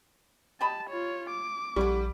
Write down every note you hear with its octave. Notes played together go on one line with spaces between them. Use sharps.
G4 D#5 A5 B5
F4 C#5
D6
A#1 D3 G3 E4 C#6